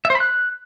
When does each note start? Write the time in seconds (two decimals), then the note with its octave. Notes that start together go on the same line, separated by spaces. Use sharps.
0.05 E5
0.10 C5
0.15 B5
0.20 F#6